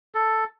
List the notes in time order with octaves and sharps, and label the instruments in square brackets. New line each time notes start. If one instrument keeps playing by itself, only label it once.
[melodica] A4